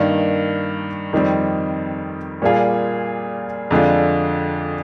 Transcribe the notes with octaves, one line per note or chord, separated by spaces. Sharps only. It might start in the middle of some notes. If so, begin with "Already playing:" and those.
Already playing: G2 D#3 A#3 D4
F2 D#3 G3 C4
A#2 G3 A#3 F4 G#4
F2 D3 G#3 D4 F4